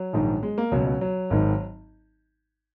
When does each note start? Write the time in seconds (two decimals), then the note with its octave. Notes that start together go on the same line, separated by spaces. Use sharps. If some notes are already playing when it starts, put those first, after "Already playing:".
Already playing: F#3
0.13 A#1 G#2 D#3
0.43 G#3
0.58 A#3
0.71 C#2 B2 F#3
0.86 F#3
1.01 F#3
1.30 G#1 G#2 D#3